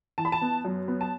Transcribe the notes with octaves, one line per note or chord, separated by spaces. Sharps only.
E3 A5
B5
A5
B3
F#2
B3
A5